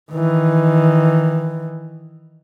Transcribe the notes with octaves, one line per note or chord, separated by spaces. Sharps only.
D#3 E3